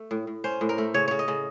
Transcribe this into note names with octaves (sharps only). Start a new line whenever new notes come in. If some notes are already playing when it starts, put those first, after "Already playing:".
Already playing: A3
A2
A2
C#4 C5
A2
A#4
A3
C#3 C#5
C#3 C#5
D#5
C#3